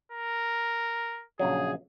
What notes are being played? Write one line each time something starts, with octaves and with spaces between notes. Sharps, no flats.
A#4
A#1 C#3 F#3 G#4